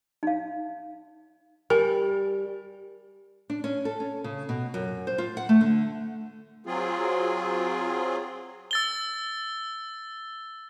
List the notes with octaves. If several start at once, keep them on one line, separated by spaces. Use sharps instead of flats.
D#4 F5
G3 A#4 G#5
D4
C#4
A4
C#4
C#3
B2
F#2
C5
F4
F#5
A3
D3
F#3 C4 F4 G#4
E6 A6 G7